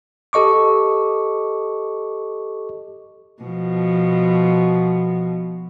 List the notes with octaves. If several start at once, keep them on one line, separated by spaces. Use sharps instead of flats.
G4 A4 D#5 C#6 D6
B2 F3